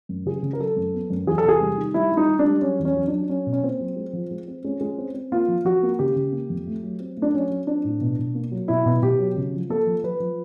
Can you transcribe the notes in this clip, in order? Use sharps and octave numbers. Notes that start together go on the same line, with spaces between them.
F#2
C#3 G#4
C#3
A#4
F#3 A4
F#2
B3
F#2
E2 G#4
A4
C3 G#4
G3
D#3
G3 E4
G3
D#4
G3
D4
G3
F#3 C#4
E2
C#4
F#3
F#3 D4
F#3 C#4
B2
C#4
A#3 C4
F#3
G#3
F3
G#3
C4
G#3 C#4
G#3
C4
C4
A#3 F4
F3
F3 F#4
A#3
C#3 G4
C#3
A#3
F2
A3
F#3
C4
A3
D4
F#3 C#4
F#3
C4 D4
A2
B2
B2
A#3
F#3
B2 E4
B2
B2 G4
F#3
C#3
F3
A#3 A4
F3
F3 B4
F3